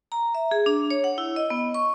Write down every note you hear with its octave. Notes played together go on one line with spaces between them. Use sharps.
A#5
E5
G#4
D4
C#5
F#5
E4
D#5
B3
C#6